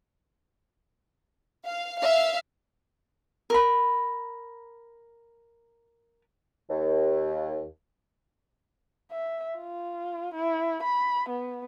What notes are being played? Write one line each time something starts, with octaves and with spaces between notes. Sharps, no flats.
F5
E5 F5
A#4 B5
D#2
E5
F4
E4
B5
B3